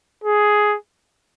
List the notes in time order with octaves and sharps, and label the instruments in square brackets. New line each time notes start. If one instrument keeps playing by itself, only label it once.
[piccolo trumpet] G#4